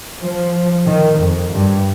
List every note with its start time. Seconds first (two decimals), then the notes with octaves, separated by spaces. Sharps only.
0.20 F3
0.86 D#3
1.19 F2
1.52 G2